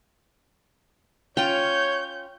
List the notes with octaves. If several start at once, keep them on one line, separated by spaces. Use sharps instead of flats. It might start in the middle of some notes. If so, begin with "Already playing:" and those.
C#4 F4 C#5 G5 G6